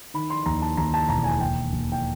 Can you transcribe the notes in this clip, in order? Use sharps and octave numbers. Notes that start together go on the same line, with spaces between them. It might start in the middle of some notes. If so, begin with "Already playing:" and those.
D#3 B5
C6
D#2 A#5
A5
D#2 A#5
A5
E1 A#5
G#5
D#2 G5
D#2
G5